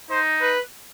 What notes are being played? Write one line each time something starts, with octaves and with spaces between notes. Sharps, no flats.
D#4 C5
B4